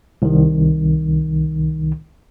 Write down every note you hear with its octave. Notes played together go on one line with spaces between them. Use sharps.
C2 D#3